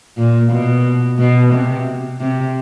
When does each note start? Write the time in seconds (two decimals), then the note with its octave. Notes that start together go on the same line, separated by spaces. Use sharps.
0.18 A#2
0.52 B2
1.19 B2
1.52 C3
2.21 C3